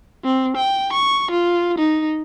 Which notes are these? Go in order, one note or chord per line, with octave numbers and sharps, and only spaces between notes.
C4
G5
C#6
F4
D#4